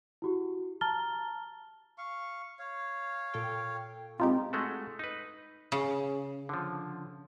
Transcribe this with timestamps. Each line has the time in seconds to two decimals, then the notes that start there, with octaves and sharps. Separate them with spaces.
0.22 E4 F#4 G4
0.81 A5 A#5 F6 A6 G7
1.98 F5 C#6
2.59 C#5 F5
3.34 A#2 A4 G5
4.20 A#2 G#3 C4 D#4 F4 G4
4.53 G#3 A3 F#4
4.99 D#4 B4
5.72 C#3
6.49 D3 F3